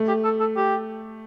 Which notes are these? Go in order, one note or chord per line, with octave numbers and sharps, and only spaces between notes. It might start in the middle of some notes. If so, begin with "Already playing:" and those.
Already playing: A3
G4
A4
A4
G4